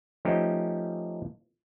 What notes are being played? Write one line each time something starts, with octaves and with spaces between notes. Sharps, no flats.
F3 A3 C#4 D#4 G4